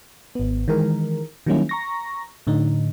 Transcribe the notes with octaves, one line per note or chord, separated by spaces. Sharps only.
G#1 B3
D#3 E3 G#3 A#4
D#3 F#3 G3 A#3 C#4 E4
A#5 C#6 A#6
A2 D3 D#4